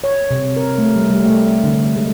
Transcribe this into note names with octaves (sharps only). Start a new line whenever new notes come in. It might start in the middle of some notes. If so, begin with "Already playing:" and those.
C#5
C3
A#4
A3
G3
G3
A3
D3
G#3